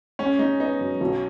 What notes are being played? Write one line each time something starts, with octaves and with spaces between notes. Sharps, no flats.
G#3 C#4
G#3 D#4
B3 D#4
F#2
B1